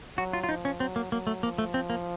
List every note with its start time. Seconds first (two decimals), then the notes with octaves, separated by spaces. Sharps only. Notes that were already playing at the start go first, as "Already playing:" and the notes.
0.17 F#3 F#4
0.33 F4
0.43 F4
0.49 F3 D#4
0.65 C#4
0.80 F#3 C4
0.96 A#3
1.12 F#3 A#3
1.27 A3
1.43 F3 A#3
1.58 A3
1.74 C4
1.90 A#3